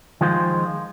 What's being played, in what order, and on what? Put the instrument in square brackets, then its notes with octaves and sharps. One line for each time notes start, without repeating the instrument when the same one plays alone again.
[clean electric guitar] D#3 F3 G#3 F4 C5